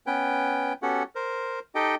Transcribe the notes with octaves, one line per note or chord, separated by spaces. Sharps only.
B3 C#4 B4 G5
B3 C#4 F#4 G4 A4 F#5
A#4 C5
D#4 G4 A4 D#5 G5